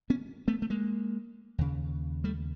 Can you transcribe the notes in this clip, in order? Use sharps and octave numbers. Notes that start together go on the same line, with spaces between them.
B3 C#4
A3 B3
A3
G#3 A#3
D#2 C#3
G3 A3